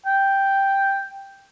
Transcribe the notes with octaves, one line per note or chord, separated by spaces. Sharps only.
G5